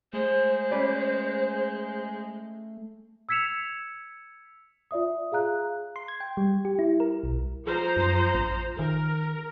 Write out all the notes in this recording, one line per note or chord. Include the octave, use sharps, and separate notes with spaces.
G#3 A3 C5
C#4 B4 D5
E6 G#6 B6 C#7 E7 F7
F4 D5 E5 D#6
G#4 F5 A#5 F#6
C6
G#6
G5
G3
G4
E4
A#4
B1
F3 C5 A#5
F#2
A1
D#3 A#4